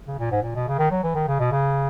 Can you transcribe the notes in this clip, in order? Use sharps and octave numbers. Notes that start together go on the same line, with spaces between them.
C#3
A#2
G#2
A#2
B2
C#3
D#3
F#3
E3
D#3
C#3
B2
C#3